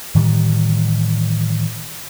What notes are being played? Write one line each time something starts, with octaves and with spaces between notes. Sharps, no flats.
A2 D#3 E3 G3